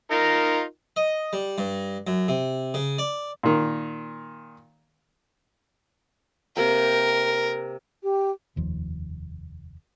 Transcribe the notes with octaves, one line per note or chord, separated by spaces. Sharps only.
D#4 F4 A#4
D#5
G3
G2
F#2
C3
C#3
D5
A#2 D#3
C3 A#3 A#4 G5
G4
F1 D#2 F3